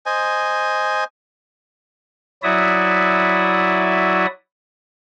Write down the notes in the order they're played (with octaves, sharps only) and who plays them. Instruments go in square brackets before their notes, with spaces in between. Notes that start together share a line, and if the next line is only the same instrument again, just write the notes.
[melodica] C5 D#5 G#5
[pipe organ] F#3 E4 F#4 D5 E5 D#6